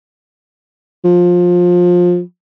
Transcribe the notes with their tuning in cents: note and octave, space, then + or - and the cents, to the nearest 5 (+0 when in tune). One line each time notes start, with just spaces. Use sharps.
F3 +20